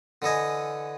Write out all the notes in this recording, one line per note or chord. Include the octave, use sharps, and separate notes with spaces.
D3 E3 A4 D#5 G#5